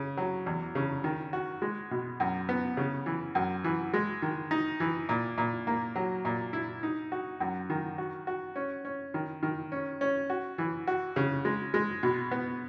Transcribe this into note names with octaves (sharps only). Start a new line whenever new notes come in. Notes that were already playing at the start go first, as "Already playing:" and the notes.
Already playing: C#3
F#3
E2
C#3
D#3
F#4
G#3
B2
F#2
B3
C#3
E3
F#2
E3
G#3
D#3
D#4
E3
A#2
A#2
A#3
F#3
A#2
E4
D#4
F#4
F#2
D#3
F#4
F#4
C#4
C#4
D#3
D#3
C#4
C#4
F#4
E3
F#4
C#3
G#3
G#3
B2
B3